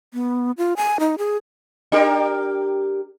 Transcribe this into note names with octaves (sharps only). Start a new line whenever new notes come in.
B3
F4
G#5
D#4
G#4
D4 G4 A#4